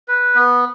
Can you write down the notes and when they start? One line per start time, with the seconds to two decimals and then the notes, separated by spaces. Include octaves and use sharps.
0.08 B4
0.35 B3